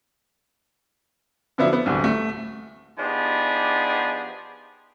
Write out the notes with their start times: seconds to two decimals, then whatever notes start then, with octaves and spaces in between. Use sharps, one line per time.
1.58 D3 F3 F#3 B3 D4 E4
1.73 B3
1.86 D1 C2 D3
2.04 A3
2.99 F3 B3 D4 D#4 G4 G#4